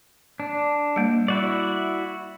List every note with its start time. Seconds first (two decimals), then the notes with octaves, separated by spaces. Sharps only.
0.40 D4
0.96 G3 A#3
1.28 E4 F#4 D5